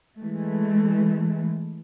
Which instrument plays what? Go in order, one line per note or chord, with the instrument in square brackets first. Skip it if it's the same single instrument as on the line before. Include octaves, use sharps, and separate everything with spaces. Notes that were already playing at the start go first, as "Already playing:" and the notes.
[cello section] E3 G#3 A3